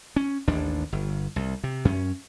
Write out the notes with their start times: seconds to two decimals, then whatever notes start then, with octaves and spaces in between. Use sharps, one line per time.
0.16 C#4
0.48 A1 D#2 D4
0.92 G1
1.36 C2
1.64 C3
1.85 F#2 C#4